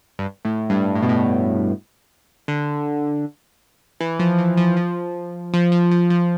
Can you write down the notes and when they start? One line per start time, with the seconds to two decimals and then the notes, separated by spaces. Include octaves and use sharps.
0.19 G2
0.45 A2
0.70 G2
0.95 A2
1.02 B2
1.09 A2
2.48 D3
4.00 E3
4.19 F3
4.38 E3
4.57 F3
4.77 F3
5.53 F3
5.72 F3
5.91 F3
6.10 F3